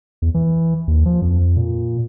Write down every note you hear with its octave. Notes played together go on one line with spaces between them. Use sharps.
E2
E3
D#2
F3
F2
A#2